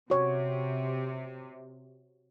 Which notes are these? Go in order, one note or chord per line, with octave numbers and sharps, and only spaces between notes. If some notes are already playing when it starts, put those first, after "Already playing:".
C3 F#4 C#5